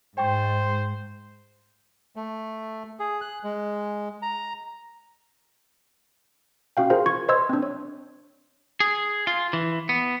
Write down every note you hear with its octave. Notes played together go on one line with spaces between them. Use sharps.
G#2 C5 G5 C#6
A3
G#4
F#6
G#3
A#5
C#4 F#4 F5 G5
F4 G#4 A#4 C5 F5
F4 C#6 G#6
B4 C5 D#5 C6 E6 G#6
C4 D4
C#5
G#4
F4
E3
B3